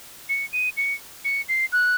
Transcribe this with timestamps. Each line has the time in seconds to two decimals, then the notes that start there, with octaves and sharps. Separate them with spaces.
0.29 C#7
0.53 D#7
0.77 C#7
1.25 C#7
1.49 C7
1.72 F#6